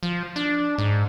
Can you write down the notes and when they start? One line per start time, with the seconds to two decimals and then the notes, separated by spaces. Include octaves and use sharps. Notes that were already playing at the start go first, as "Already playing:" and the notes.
0.03 F3
0.36 D4
0.78 G#2